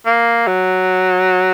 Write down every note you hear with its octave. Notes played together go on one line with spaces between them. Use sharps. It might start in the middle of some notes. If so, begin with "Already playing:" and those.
A#3
F#3